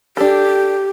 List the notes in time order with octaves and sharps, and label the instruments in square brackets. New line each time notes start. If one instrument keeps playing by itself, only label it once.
[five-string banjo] D4 A4 [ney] G4